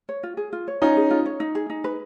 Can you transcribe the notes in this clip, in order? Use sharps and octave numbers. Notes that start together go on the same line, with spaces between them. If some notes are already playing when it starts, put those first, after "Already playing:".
C#5
F4
G#4
F4
C#5
C#4 D#4 F4
G#4
F4
C#5
D#4
G#4
D#4
B4